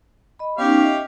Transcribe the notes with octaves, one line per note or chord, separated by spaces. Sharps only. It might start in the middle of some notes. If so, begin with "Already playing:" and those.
D#5 B5
B3 C#4 D#4 G4 C#5 F5
D#5 E5